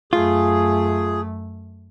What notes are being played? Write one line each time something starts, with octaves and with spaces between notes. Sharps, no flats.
F#2 A3 F4 G#4